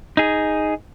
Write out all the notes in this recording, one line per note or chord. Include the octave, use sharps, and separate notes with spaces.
D#4 G#4